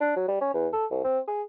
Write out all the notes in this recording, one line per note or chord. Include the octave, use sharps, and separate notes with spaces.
D4
F#3
G3
C#4
E2
A4
C2
C4
G#4